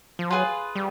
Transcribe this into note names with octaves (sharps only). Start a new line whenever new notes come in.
F3
F#3 F4 G#4 B4
G3